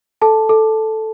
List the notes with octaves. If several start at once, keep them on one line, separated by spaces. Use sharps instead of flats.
A4 A5
A4